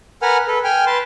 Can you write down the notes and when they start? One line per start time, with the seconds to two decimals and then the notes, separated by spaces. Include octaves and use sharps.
0.22 A#4 B4 F#5 G#5 F6
0.48 A4 B4
0.64 G5 G#5 F6
0.86 B4 A5 C6